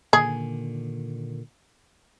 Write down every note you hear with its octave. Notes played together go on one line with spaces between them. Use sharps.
A#2 D3 D#3 G#4